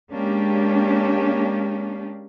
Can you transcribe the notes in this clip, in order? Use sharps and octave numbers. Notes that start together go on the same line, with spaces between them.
G#3 A#3 C#4 D4 G4